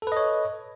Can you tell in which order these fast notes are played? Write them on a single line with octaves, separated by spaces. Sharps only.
A4 B4 D#5 C#5